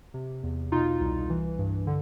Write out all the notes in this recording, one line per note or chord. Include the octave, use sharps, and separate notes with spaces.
C3
E2
B2 D#4 F4
C2
E3
G2
D3